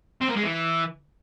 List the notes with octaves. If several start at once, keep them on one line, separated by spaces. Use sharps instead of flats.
C4
A#3
G#3
E3